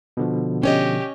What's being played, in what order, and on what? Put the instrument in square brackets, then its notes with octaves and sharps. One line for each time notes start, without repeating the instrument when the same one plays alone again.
[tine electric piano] B2 D3 F3
[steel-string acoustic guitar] C#4 C#5 D#5 [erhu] G4